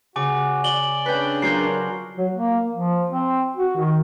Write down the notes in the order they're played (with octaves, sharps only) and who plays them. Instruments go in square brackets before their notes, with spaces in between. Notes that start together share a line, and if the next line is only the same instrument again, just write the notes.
[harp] C#3 [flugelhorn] F#4 [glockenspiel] G#5 D6
[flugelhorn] D5 [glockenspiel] F#7 G7
[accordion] C#3 D4 [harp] B4 G5
[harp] F#3 F4 G6 [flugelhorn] A#4 [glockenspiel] C7
[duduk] F#3
A#3
F3
C4
F#4
D#3